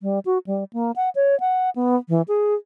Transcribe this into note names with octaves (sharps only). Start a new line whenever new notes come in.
G3
F#4
G3
A#3
F#5
C#5
F#5
B3
E3
G#4